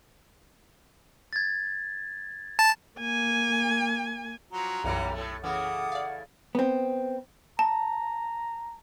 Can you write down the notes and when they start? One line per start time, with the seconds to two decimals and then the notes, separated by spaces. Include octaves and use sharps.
1.33 G#6 A6
2.59 A5
3.00 A#3 G#5
4.52 F3 F#3 C#4 A#5
4.84 B1 F#2 A2 E3 G3 F#5
5.14 A2 A3 A4
5.44 C#3 E3 A3 F#5 D6 D#6
5.92 D5 F5
6.55 B3 C4
7.59 A5 A#5